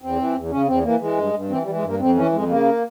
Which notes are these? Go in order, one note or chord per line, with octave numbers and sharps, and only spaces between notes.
E2 C4
E3
E2
C#3 C#4
E2 C4
E3 A#3
E3 G#3
G2
G2
E3 C4
G3
E3
G#3
G2 A#3
F2 C4
E3 C#4
F2 G#3
C#3 A#3